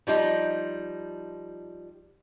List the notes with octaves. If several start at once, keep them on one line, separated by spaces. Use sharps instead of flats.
F3 G3 D#4